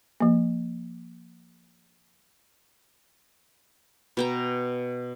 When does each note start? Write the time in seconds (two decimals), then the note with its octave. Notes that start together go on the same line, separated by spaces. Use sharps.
0.20 F3 A#3
4.17 B2 G5 A#5